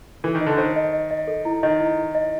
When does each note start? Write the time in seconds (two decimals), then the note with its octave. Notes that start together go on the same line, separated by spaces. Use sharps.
0.24 E3 A4
0.35 D#3
0.41 D#5
0.47 D3
0.57 D#3 C5
0.76 D#5
0.93 D#5
1.11 D#5
1.27 A4
1.45 E4
1.63 D#3 D#5
1.80 E4
1.97 E4
2.15 D#5